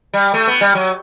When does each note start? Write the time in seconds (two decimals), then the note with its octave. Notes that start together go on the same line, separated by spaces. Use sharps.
0.14 G3
0.34 A3
0.47 B3
0.61 G3
0.75 F#3